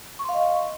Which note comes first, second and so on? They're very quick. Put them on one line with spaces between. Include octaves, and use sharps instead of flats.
C#6 C6 F5 D#5